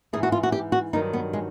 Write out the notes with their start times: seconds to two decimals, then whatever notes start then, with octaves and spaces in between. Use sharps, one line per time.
0.13 G#2 E3 G#4
0.23 F#4
0.32 F4
0.43 F#4
0.52 G4
0.72 F#4
0.93 G2 D#3 F#3 D#4
1.13 B3
1.33 G#3